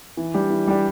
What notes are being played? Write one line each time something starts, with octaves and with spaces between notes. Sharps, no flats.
E3
G3 D4 G4
E3
G3 D4 G4